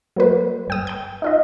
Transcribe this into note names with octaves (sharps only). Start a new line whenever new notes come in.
F#3 A#3 B4
G1 G5 D#6
G5 G6
D#4 F4 D#5